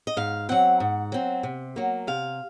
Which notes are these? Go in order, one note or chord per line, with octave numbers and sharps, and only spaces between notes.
D#5
G#2 F5
F#3 C4 F#5
G#2
F#3 C4
C3
F#3 A#3
C3 F5